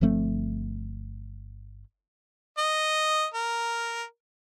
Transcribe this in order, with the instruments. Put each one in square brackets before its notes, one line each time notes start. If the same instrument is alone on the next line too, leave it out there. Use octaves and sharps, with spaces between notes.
[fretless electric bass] G1 F3 A3 C4
[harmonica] D#5
A#4